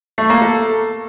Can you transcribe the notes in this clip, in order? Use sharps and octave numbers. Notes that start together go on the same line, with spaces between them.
A3
A#3
A4